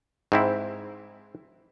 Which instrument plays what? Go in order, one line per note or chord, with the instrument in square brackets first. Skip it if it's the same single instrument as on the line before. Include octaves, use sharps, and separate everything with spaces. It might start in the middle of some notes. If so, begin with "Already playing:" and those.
[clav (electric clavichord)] G#2 C4 E4